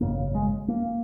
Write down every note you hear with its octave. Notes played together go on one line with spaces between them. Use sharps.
G#1 F#2 C#3 A#3
G#3
A#3